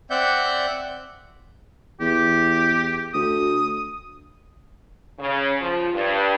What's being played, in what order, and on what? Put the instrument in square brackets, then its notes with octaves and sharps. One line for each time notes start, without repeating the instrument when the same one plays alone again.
[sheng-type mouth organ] C4 D5 E5 F#5 G6
[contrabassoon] E2 [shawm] G4
[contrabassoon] D2 [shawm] D#6
[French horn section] C#3
F3
G2